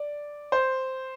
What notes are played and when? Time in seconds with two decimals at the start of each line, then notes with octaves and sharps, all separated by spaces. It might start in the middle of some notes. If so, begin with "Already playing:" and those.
Already playing: D5
0.52 C5